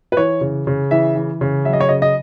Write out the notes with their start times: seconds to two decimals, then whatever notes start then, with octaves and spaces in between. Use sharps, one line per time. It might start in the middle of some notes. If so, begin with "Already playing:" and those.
0.12 B4
0.17 E3 C#5
0.41 C#3
0.67 C#3
0.91 E3 E5
1.16 E3
1.41 C#3
1.65 F#3 E5
1.73 D#5
1.81 C#5
1.89 C#3 D#5
2.02 D#5